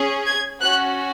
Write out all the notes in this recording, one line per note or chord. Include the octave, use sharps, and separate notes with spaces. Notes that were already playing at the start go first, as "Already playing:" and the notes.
Already playing: C#4 G#4
G#6
C#4 F#4 F#6